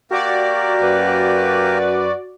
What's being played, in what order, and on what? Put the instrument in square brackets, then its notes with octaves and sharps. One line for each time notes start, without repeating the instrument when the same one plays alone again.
[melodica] A#3 G4 A#4 [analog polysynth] F#4 D5
[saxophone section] F#2 B4